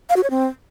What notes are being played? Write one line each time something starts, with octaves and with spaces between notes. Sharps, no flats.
F5
F#4
C#5
C4